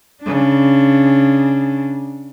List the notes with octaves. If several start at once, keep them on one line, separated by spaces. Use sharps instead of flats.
C#3 D4